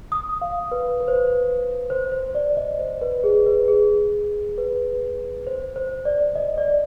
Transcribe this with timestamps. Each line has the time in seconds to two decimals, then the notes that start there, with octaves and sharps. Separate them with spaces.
0.12 D#6
0.42 F5
0.71 B4
1.00 B4
1.08 C5
1.15 B4
1.90 C5
2.12 C5
2.35 D5
2.57 D#5
2.79 C5
3.01 B4
3.24 G#4
3.46 B4
3.68 G#4
4.58 B4
5.47 C5
5.76 C5
6.05 D5
6.36 D#5
6.58 D5